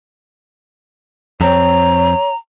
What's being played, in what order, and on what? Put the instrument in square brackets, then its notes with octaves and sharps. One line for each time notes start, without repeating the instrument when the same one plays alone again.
[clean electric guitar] F2 C4 [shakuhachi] C#5 [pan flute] A#5